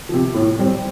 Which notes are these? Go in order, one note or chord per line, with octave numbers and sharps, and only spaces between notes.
C3 F3
A2
G3 C4